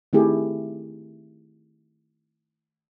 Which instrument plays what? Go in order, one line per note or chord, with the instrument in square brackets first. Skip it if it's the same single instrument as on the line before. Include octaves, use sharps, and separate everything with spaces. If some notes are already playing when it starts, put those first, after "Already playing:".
[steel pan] D#3 A3 C4 E4 G4 G#4